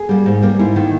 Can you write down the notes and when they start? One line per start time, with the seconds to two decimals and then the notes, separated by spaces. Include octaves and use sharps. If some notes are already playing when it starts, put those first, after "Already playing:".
Already playing: G#4
0.09 G3 A#3
0.26 G#2
0.42 G3 A#3
0.59 G#2 E4
0.76 D#3 A#3